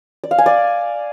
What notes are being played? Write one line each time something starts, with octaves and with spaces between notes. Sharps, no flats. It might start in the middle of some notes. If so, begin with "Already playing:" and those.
D5
F5
G#5
D5